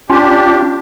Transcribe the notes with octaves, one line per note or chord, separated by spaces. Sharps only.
C#4 D4 F4 G4